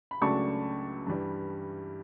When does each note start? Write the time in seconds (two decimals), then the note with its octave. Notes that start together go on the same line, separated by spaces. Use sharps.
0.11 B5
0.21 C#2 C#3 F#3 A3 D4 A5 C#6
1.06 G2 E3 G3